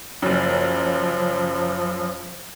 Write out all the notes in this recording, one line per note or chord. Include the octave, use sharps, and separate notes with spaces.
F#1 F#2 F3